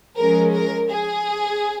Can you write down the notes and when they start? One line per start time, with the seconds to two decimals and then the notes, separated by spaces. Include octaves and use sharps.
0.16 F3 G#3 C#4 A#4
0.53 A#4
0.90 G#4